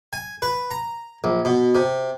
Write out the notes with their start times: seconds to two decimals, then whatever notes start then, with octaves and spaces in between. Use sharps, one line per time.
0.13 G#5
0.42 B4
0.71 A#5
1.24 A#1
1.45 B2
1.75 C3